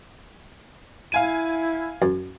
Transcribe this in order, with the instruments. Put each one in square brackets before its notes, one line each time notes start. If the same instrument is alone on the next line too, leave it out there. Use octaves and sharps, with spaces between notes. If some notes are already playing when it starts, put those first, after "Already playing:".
[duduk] E4 [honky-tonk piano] F5 G#5 D#7
[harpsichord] F#2